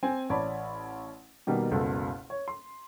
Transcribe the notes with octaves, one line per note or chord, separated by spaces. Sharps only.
C4 G#5
A1 C#5 D5 A5 B5
B2 D#3 G3 A#3 B3
F#1 C#2 B2 A4
C#5
C6